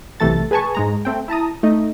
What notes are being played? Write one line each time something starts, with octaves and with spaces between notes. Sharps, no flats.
B1 C3 E3 A3 A4 A6
G#4 B4 G#5 A5 C#6
G#2 G#3 A#5
A3 C4 G5
E4 A5 A#5 D#6
A3 D#4 D#5